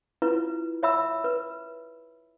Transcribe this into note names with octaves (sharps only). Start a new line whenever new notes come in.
E4 F4 B4
C#5 E5 B5 E6
B4